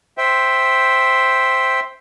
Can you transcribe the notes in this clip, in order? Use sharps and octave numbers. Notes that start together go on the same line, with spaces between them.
C5 E5 G5